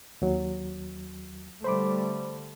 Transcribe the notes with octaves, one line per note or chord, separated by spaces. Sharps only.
D#2 F#3
D3 G3 A3 C5 B5 D6